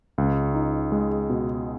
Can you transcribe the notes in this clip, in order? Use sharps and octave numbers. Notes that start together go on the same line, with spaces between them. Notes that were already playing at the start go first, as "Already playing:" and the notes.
C#2
D#4
G#3
B2